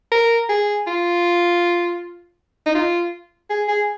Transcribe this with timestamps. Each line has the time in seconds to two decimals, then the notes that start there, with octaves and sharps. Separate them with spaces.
0.12 A#4
0.49 G#4
0.87 F4
2.66 D#4
2.75 F4
3.50 G#4
3.68 G#4